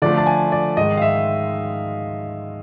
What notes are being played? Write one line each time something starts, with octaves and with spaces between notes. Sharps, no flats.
D3 F3 A3 D5
A5
G#5
D5
G#2 D#3 G#3 D#5
F5
E5